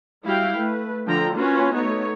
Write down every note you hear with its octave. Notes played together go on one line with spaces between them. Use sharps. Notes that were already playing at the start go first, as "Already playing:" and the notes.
G3 E4 F#4 F5 G5
A3 B4
D3 F3 G5 A#5
A#3 C#4 F4 F#4 B4
A3 B3 D#4 C#5